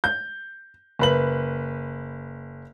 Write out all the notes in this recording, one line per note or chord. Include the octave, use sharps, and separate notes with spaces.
G6
F#1 B4 F#7